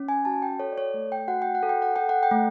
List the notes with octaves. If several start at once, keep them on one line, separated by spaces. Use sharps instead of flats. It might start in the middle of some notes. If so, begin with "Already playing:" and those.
Already playing: C#4
G#5
F#4 A5
G5
A4 C#5
D5
C#5
A3
G5
F#4 F#5
G5
F#5
A4
G5
F#5
A4 G5
F#5
G5
A3